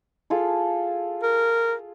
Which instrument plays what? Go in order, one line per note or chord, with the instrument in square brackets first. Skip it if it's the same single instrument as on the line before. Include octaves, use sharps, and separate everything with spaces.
[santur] F4 G#4 A4
[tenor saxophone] A#4